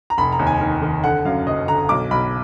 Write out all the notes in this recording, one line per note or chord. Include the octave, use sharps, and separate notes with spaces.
A#5
F1 B5
A#5
D#2
G#5
D#3
D#3
D3 F#5
F#2 F5
F#1 D#5
D3 A#5
B1 D6
B1 B5